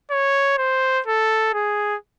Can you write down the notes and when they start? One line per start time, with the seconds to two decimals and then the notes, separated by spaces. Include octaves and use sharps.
0.11 C#5
0.58 C5
1.06 A4
1.54 G#4